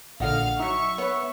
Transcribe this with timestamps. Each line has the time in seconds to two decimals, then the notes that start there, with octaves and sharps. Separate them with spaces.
0.20 A#1 A#2 D3 D#5 F5 F#5 F6
0.60 F#3 D#4 E5 C#6
0.98 B3 B4 C#5